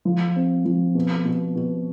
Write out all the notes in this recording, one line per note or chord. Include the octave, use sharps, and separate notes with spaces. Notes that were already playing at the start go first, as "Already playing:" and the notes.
F3
C4
F3
B2
B2
B2